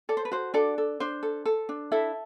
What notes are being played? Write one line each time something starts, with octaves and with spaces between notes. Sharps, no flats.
A4 D5
C5
B4
F#4 C5
D4 A4 D5
A4
D4 C5
A4
A4
D4
E4 A4 E5